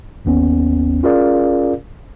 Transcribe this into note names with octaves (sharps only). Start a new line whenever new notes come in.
G1 D#2 B3 C#4
C#4 F4 G#4 A#4 D5 F5